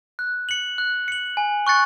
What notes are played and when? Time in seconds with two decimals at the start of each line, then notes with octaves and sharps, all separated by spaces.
0.19 F#6
0.49 C#7 F#7
0.78 F#6
1.08 C#7 F#7
1.37 G#5
1.67 C#6 F#6 A6 C#7